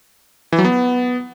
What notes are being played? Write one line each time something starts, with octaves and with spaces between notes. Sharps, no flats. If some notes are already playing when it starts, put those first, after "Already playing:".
E3
F#3
B3